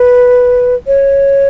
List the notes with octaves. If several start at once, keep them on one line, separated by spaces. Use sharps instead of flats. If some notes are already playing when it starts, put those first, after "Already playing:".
Already playing: B4
C#5